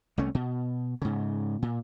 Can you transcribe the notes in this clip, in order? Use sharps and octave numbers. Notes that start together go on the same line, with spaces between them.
C2 A3 C#4
B2
G#2 C#3
A#2